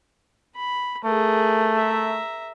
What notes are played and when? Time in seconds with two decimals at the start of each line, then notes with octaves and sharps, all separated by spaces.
0.55 B5
1.04 A3 G#4 A#4
1.78 E5 A#5